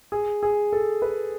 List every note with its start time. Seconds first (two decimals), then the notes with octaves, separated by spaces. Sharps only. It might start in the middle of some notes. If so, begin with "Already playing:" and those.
0.12 G#4
0.43 G#4
0.73 A4
1.02 B4